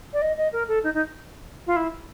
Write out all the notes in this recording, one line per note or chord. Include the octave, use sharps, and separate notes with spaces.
D5
D#5
D#5
A#4
A4
D#4
D#4
F4
E4